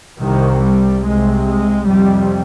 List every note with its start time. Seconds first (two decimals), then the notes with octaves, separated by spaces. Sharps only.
0.20 C2 C3 D#3
0.62 G3
1.03 C2 C3 G#3
1.45 G#3
1.86 F2 C3 G3